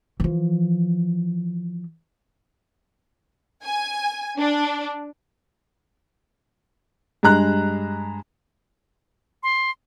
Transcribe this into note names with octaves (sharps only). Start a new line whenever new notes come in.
E3 F3
G#5
D4
G2 G#3 A#5 F#6
C6